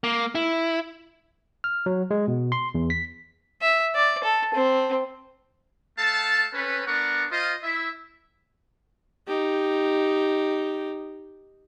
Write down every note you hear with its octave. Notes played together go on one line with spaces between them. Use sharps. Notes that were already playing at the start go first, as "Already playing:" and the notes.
A#3
E4
F6
F#3
G#3
B2
C6
E2
B6
E5
D5
A4
C4
A3 A4 F5 A5
C4 C#4 A4 B4
B3 D4 A#4 D5 F#5 C#6
F4 C5 D#5
E4 E5
D#4 G4